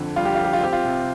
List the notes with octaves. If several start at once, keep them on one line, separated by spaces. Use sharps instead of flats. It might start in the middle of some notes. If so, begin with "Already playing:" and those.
Already playing: F2 D3
G3 F4
G4
F2 F4
G4
F4
C4 G4
F4
C3